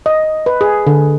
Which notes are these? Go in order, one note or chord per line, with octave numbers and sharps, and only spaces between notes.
D#5
B4
G#4
D3